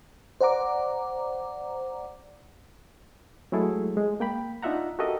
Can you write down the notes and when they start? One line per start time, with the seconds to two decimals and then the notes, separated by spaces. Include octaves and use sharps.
0.41 C5 D5 F#5 A#5 D6
3.52 F#3 G#3 A3 E4 G#4 A4
3.97 G#3
4.20 A#3 G5 B5
4.63 D4 D#4 F4 E5 F#5 A#5
4.99 F#4 G4 A4 A#4 D#5 E5